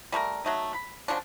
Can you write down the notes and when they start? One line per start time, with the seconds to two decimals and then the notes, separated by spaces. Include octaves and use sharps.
0.12 G3 A3 G4 A#4
0.44 F#3 A3 D#4
0.74 B5
1.08 C#3 F3 F#3 D4